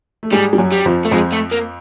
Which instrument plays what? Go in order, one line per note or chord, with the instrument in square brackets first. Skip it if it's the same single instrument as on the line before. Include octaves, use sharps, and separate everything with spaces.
[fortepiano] A3
[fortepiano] G#2 G#3 [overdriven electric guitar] G3
[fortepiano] G3
F#2 F#3
[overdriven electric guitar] G3
[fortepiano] F2 F3
[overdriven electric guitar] A3
[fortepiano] F2 F3 [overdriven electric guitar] G#3
[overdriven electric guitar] A3
A#3